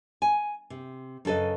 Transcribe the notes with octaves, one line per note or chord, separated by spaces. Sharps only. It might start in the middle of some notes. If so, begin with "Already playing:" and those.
G#5
C3
F#2 C#3 A4 B4 D#5